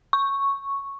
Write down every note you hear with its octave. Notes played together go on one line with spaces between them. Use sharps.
C#6